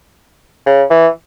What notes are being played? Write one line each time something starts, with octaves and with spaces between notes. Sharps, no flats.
C#3
E3